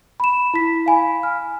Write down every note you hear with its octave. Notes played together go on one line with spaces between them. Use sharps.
B5 E7
E4 B6
F5 G#5 B5
F6